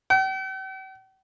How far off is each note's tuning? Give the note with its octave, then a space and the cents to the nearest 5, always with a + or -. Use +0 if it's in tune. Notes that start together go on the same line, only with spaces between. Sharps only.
G5 -45